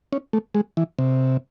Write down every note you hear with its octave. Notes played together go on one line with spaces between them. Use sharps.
C#4
A3
G#3
E3
C3